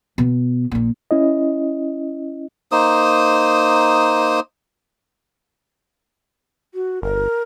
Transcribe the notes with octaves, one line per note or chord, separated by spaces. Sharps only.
B2 B3
A#1 A#2
C#4 E4 D#5
A#3 D#4 C5 D#6
F#4
G1 A#4